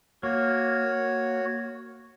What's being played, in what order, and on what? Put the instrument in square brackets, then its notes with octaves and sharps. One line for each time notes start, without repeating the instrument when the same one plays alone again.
[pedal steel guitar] A#3 [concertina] F#4 C#5